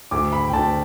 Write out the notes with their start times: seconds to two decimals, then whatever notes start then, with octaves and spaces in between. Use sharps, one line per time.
0.11 D2 D6
0.33 B5
0.48 G5
0.53 D2 A5